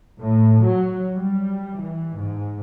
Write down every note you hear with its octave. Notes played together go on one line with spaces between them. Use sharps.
A2
F#3
G3
E3
G#2